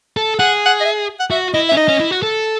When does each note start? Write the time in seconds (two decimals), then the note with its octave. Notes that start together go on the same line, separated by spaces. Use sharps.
0.17 A4
0.39 G#4 F#5
0.66 F#5
0.81 D#5
0.85 E5
1.20 F#5
1.31 F#4 E5
1.53 E4 D#5
1.69 E5
1.72 C#4
1.76 D#4 D#5
1.88 C#4
2.00 E4
2.11 F#4
2.23 A4